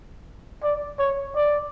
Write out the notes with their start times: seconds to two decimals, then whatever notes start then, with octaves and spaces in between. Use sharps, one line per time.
0.63 D5
0.99 C#5
1.36 D5